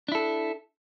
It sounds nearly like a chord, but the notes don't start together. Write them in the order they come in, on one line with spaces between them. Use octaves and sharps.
D4 E4 A4